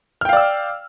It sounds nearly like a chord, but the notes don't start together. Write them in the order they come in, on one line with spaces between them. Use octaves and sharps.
F6 G5 F5 D5 E6